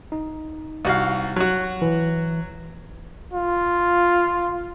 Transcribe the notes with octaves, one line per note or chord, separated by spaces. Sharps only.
D#4
C2 F#4 F5
F#3 F#4
E3
F4